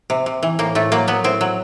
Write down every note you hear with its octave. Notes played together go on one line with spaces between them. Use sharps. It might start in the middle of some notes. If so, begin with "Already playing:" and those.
C3
C3
E3
A2 A#3
A2 A3
F#3 A#3
F#3 B3
A2 C4
F#3